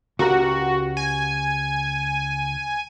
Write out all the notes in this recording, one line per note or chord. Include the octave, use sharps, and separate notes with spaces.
C#2 F#4 G4 A#4
G#5